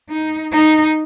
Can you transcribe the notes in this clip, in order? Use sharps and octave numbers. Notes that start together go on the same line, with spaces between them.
D#4
D#4